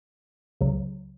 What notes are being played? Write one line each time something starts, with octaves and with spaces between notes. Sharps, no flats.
C#2 C#3 F#3